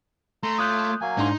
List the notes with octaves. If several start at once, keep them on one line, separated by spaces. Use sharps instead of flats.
A3 A#5 C6
F4 C#5 D6 D#6 F#6 G6
F#3 A#3 G#5
G#2 D4 D#4 C6